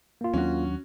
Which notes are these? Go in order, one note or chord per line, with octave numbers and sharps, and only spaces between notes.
A#3 F4
D#2 F#3 C#4 D4 F#4